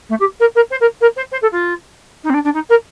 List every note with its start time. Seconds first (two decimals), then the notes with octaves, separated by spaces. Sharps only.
0.09 A3
0.19 G4
0.40 A#4
0.55 A#4
0.70 C5
0.80 A#4
1.01 A#4
1.16 C5
1.31 C5
1.42 A4
1.52 F4
2.23 D#4
2.29 C4
2.33 D4
2.44 D4
2.53 D#4
2.69 A#4